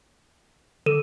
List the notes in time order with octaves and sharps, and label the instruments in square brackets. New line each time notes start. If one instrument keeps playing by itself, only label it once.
[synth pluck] D3 [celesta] A4 D#7 E7